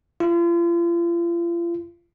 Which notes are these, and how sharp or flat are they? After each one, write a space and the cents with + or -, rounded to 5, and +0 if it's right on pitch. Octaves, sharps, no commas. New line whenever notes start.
F4 -40